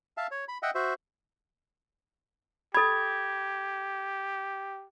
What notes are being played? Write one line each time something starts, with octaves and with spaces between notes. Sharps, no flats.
E5 F5 A5
C#5
B5
D#5 E5 F#5 G5
F#4 C5 E5
G4 A4 B5 G#6 A6